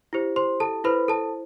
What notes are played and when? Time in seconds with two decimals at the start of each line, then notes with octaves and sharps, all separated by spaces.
0.13 E4 G4 C5
0.36 C5 C6
0.60 A4 A5
0.84 E4 A4 B4 C5 B5
1.08 A4 A5